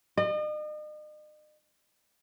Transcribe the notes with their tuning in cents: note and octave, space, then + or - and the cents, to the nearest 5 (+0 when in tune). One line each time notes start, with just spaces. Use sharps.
D#5 -40